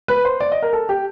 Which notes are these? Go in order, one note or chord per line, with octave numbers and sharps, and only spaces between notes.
B4
C5
D5
D#5
A#4
A4
G4